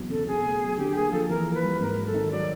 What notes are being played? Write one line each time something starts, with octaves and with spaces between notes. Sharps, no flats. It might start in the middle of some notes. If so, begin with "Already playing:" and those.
Already playing: E2 B2 F#3
C#3 A4
B2 G#4
A3
F#3
D3 G4
A#3 G#4
F3 A4
A4
E3 A#4
A#3
B4
G3
G#2 A#4
F#3
A4
D#3
F#3 D5